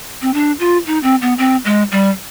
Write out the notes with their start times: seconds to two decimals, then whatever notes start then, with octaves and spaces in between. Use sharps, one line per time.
0.22 C4
0.34 D4
0.60 F4
0.87 D#4
1.03 C4
1.22 B3
1.38 C4
1.65 G#3
1.92 G3